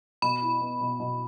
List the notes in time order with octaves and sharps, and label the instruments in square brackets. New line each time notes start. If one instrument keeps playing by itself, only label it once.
[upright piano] B2 [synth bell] B5
[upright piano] E4
B3
B2
B2